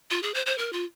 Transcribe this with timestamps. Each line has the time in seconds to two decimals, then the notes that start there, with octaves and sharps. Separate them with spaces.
0.11 F4
0.23 G#4
0.34 C5
0.46 C5
0.58 A#4
0.73 F4